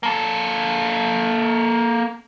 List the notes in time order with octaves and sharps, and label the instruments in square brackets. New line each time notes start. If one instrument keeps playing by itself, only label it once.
[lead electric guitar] A#3 A4